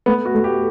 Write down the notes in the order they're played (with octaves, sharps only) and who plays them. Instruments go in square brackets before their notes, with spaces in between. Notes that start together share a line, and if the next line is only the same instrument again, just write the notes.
[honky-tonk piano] A3 [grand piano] B3
[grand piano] F#4
[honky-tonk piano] A3
[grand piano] G4